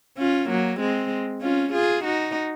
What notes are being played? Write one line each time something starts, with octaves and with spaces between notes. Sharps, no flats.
C#4 F4
F#3 A#3
G#3 C4
C#4 F4
F4 G#4
D#4 F#4